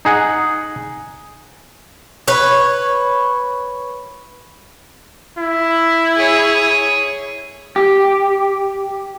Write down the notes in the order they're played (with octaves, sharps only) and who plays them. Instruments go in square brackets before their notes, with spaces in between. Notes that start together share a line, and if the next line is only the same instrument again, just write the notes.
[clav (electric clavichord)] D#4 G#4 F#5
[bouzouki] B4 C#5
[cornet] E4
[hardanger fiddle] G#4 C#5
[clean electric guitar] G4